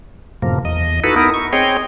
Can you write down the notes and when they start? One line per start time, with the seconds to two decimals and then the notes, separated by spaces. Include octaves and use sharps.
0.42 F#2 A2 C3 F3 A#3
0.65 E2 D#5
1.04 D#4 E4 F#4 A4 B4
1.16 B3 D#4 E4 A#4
1.34 C#6
1.53 C4 G#4 C#5 D#5 G5